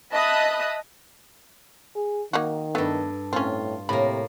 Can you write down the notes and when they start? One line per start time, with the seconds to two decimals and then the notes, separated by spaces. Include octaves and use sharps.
0.12 D#5 E5 A5 B5 D#6 F#6
1.96 G#4
2.33 D#3 A#3 D#4 F#4
2.75 G2 A3 B3 A4
3.33 A2 C4 C#4 F4
3.89 A2 C3 A#3 B5